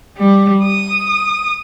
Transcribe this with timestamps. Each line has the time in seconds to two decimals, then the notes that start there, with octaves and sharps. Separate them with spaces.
0.18 G3
0.64 D#6